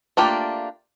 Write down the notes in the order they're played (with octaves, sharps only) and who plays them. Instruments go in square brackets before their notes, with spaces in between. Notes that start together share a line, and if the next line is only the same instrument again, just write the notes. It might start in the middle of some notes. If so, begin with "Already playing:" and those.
[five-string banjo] A3 A#3 D4 F4 G4